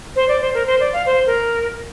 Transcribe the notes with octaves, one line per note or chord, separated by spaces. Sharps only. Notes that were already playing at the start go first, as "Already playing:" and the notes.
C5
D5
C5
A#4
C5
D5
F5
C5
A#4